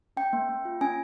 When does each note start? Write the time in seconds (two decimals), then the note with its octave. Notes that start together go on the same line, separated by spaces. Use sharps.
0.17 C#4 G5
0.33 A#3
0.49 A#3
0.65 F4
0.81 C#4 G#5